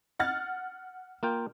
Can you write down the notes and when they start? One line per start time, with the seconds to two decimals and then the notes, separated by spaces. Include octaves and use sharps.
0.19 F#5 F6 A6
1.23 A#3 F4 G5